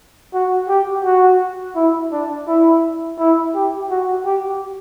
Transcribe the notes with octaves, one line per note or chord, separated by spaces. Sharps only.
F#4
G4
F#4
E4
D4
E4
E4
G4
F#4
G4